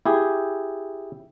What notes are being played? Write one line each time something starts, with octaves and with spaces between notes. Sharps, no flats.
E4 G4 G#4